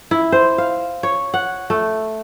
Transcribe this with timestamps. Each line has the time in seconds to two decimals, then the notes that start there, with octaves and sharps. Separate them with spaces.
0.11 E4
0.32 C5
0.58 F5
1.03 C#5
1.34 F#5
1.70 A3